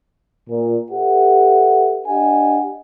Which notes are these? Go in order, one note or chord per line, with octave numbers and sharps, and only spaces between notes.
A#2
G4 A4 B4 E5 F#5
D4 G4 D#5 F#5 G#5